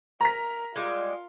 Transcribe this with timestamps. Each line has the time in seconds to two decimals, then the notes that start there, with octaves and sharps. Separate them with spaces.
0.21 A#4 A#5 B6
0.76 G3 G#3 F4